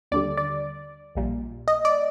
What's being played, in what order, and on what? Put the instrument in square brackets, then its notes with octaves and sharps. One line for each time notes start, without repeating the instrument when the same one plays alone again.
[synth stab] D#2 D3 G3 D5
D5
A#1 A#2 G3
D#5
D5